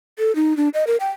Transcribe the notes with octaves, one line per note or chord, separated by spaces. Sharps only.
A4
D#4
D4
D#5
A#4
G5